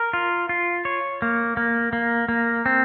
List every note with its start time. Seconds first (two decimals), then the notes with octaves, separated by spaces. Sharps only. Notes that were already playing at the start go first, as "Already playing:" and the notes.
Already playing: A#4
0.13 F4
0.49 F4
0.85 C#5
1.22 A#3
1.57 A#3
1.93 A#3
2.29 A#3
2.66 C4